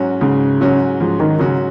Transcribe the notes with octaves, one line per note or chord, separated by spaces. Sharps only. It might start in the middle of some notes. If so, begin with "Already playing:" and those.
Already playing: G#2 F#3 C#4 F#4
G#2 C#3
F#3 C#4 F#4
G#2 F3
D#3
C#3 F#3 C#4 F#4